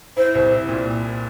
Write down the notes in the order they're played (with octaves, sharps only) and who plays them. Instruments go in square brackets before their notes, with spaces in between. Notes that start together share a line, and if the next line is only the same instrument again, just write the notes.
[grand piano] E4 [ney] C5
[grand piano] C2
E4
A#2